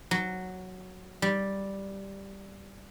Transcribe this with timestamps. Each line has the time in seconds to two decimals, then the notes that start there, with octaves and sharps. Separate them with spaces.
0.11 F#3
1.22 G3